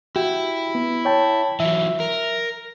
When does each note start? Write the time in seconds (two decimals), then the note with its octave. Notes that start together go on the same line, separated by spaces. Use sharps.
0.16 E4 F#4 G4 G5
0.75 B3
1.05 C#5 G5 A5
1.60 E3 F#3 E5
2.00 A#4